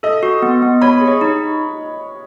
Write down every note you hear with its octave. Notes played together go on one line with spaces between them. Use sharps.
A4 D#5
F#4
B3
B3
C#5 B5
G#4
C#5
D#4